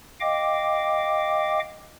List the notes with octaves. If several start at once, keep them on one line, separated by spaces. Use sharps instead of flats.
D#5 F5 G5 D6